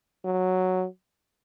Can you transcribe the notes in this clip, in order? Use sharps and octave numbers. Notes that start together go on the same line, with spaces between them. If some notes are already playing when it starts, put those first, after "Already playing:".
F#3